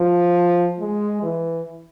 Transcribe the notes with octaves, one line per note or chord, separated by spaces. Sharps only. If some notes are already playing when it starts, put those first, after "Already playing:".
Already playing: F3
G#3
E3